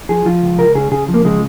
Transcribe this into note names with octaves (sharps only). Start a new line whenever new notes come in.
F3 G#4
F3 F4
C#2
C#2 A#4
C#3 G#4
C#3 G#4
F3
A#3
C#3 G#3